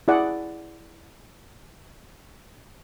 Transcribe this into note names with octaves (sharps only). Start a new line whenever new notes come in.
E4 G#4 D5 F#5